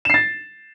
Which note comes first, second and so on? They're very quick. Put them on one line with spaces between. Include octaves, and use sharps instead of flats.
E7 C7 A6